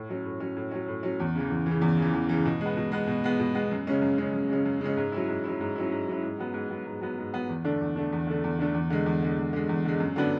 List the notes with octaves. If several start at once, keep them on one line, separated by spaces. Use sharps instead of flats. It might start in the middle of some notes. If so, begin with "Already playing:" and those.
Already playing: A2
F#3 C#4
A2
F#3 C#4
A2
F#3 C#4
A2
F#3 C#4
E2
C#3 E3
E2
E3
C#3
E2
C#3 E3
E2
C#3 E3
B2
G#3 B3
B2
G#3 B3
B2
G#3 B3
B2
G#3 B3
F#2
C#3 G#3 C#4
F#2
C#3 G#3 C#4
F#2
C#3 G#3 C#4
F#2
C#3 G#3 C#4
G#2
F#3 C#4 E4
G#2
F#3 C#4 E4
G#2
F#3 C#4 E4
G#2
F#3 C#4 E4
G#2
F#3 B3
G#2
F#3 B3
G#2
F#3 B3
G#2
F#3 B3
E2
D3 A3 D4
E2
D3 A3 D4
E2
D3 A3 D4
E2
D3 A3 D4
E2
D3 G#3
E2
D3 G#3
E2
D3 G#3
E2
D3 G#3
F#2
D3 F#3 B3 D4